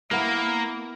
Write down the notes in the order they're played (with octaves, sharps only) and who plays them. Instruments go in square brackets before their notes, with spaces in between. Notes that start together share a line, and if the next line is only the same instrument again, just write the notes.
[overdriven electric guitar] A#3 [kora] B3 A#4 [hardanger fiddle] E4